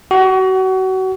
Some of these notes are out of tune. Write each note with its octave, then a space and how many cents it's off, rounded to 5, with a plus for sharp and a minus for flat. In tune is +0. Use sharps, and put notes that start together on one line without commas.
F#4 +30